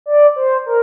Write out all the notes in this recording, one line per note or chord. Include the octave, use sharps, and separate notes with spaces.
D5
C5
A#4